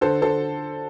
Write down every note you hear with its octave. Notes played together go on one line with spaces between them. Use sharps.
D3 A4 C5
D3 A4 C5